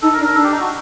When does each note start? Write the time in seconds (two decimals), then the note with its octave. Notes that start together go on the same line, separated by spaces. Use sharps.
0.02 D#4 A4
0.13 A#4
0.19 D4
0.24 A#4
0.35 D4 A4
0.43 G4
0.51 D#4
0.60 F#4